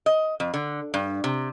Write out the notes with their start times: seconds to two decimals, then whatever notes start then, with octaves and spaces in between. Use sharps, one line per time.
0.06 D#5
0.40 F2
0.54 D3
0.94 G2
1.24 C3